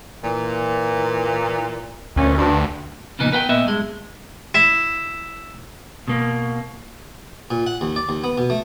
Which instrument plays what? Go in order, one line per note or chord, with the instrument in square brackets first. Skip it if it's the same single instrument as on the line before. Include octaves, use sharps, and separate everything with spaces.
[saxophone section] A#2 E3
[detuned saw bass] D2 [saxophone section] A#2 C#4
[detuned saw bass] D2 [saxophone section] G2 D4
[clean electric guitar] F2 A#2 C#3 A#3 B3 D#4
B3 B4 F#5 G5
A#2 B3 D#5 E5
G2 G#3
[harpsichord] E4
[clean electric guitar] B2 A#3
[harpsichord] A#2
F#5
D#2
D5
D#2
B3
B2
A3